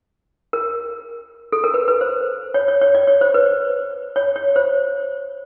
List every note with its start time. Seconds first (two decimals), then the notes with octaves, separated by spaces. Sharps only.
0.53 A#4
1.52 A4
1.64 A#4
1.74 B4
1.88 B4
2.01 C5
2.54 C#5
2.68 C#5
2.81 C#5
2.95 D5
3.07 C#5
3.21 C5
3.34 B4
4.16 C#5
4.36 C#5
4.56 C5